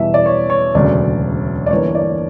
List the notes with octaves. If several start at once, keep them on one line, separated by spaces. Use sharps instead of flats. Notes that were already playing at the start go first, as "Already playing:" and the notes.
Already playing: E2 B2 G3 E5
D5
C#5
C#5
E1 D2 C#3 F#3 C#4 D5
D5
G1 G2 E3 A#3 C#5
D5